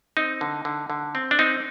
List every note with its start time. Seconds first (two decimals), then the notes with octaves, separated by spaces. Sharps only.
0.17 C4 D#4
0.41 D3
0.65 D3
0.90 D3
1.15 C4
1.31 D4
1.39 C4 D#4